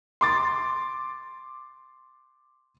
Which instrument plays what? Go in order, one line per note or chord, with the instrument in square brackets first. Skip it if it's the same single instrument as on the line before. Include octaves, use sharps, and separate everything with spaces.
[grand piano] C6 D6 A6